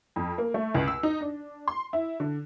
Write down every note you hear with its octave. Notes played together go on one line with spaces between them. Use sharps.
F2
A#3
A3
C#2
E6
D#4
D4
C6
E4
D3